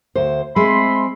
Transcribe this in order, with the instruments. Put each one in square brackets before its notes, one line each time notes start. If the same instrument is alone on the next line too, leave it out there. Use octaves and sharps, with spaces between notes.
[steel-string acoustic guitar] D2 C5
[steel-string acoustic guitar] G#3 C4 [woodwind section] E5 B5 C6